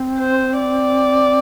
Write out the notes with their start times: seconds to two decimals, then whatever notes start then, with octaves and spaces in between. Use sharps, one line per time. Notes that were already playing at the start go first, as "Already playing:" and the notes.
Already playing: C4
0.19 C5
0.59 D5